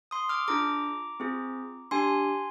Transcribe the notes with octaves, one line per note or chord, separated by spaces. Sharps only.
C6 D#6
D6 F6
D4 F4 G#4 A#5 D6
C4 F4 G#4
D4 G4 G#5 C6